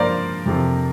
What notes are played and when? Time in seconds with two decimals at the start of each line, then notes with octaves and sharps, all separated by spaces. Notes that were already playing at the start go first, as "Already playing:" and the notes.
Already playing: G2 F3 A#3 A#4 C5 D5 F5
0.46 F2 C3 F3